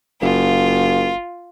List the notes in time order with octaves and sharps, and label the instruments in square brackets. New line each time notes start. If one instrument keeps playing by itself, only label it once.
[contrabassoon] F#1 [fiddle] F4